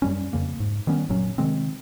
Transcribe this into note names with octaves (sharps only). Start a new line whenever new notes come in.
F#2 G3 C#4
F2 C#3 A#3
G#2
D#3 G3 B3 C#4
F#1 A#2 F#3 C#4
C3 D#3 G#3 C4